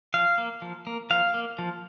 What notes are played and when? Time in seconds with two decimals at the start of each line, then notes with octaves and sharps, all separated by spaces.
0.14 F3 F5
0.38 A#3
0.62 F3
0.87 A#3
1.10 F3 F5
1.34 A#3
1.59 F3